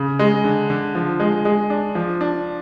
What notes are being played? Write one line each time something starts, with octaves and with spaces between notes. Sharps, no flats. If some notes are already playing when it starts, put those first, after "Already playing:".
Already playing: C#3
G#3
D3
D3
F3
G#3
G#3
D4
F3
D4